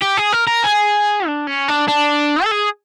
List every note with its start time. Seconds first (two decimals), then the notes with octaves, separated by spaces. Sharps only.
0.02 G4
0.17 G#4
0.33 A#4
0.47 A#4
0.64 G#4
1.27 D4
1.47 C#4
1.68 D4
1.88 D4
2.44 A4
2.52 G#4